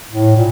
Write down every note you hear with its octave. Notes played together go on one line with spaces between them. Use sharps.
A2
A#2